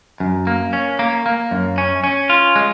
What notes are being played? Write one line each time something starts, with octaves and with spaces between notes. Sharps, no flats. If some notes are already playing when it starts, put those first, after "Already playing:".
F#2
A#3
C#4
A#3
A#3
F#2
C#4
C#4
F4
G#3